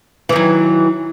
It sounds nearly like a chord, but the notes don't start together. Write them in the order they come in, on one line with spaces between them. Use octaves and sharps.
E3 D#3 F#3